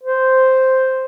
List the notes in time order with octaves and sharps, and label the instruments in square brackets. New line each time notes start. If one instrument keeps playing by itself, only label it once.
[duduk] C5